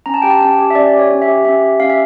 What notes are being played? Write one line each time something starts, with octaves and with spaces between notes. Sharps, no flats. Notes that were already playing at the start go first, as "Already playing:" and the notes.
C#4 A#5
A5
G4 G5
A5
C#4 A5
G4
E5
C#4 D5
G4
C#5
C#4
E5
G4
C#4 E5
G4
C#4 F5
E5